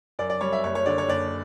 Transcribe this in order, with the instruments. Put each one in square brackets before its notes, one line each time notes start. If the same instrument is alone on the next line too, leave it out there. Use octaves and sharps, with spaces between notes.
[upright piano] F#2 D5
D5
G3 C#5
E5
F#1 C#5
C#5
D3 D5
C#5
F#1 D5